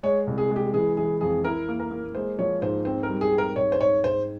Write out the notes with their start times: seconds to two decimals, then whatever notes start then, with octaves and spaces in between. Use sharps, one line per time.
0.03 G#3 C#5
0.27 C2
0.38 G#4
0.50 G#3
0.56 G4
0.73 E3 G#4
0.97 E3 G#4
1.21 F2 G#4
1.44 E4 A#4
1.69 A#3
1.80 A#4
1.91 A#3
2.15 G#3 C5
2.39 F3 C#5
2.62 G#2 C5
2.85 C4 C5
3.03 A#4
3.09 G3
3.21 G#4
3.32 C4
3.38 A#4
3.56 G#2 C#5
3.72 C5
3.80 G#2 C#5
4.04 G#2 C5